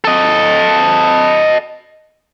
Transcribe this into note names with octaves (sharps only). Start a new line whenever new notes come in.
A4 D#5